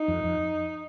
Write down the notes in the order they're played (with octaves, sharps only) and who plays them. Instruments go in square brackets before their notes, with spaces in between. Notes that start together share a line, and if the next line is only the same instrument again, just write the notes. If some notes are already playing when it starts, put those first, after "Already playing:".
Already playing: [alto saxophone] D#4
[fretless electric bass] F2
F2